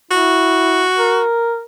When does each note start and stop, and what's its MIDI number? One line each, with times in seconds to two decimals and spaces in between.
0.11 0.85 64
0.11 1.23 66
0.98 1.63 70